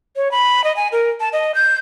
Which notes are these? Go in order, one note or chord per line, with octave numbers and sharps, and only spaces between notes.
C#5
B5
D#5
G#5
A#4
A5
D#5
G6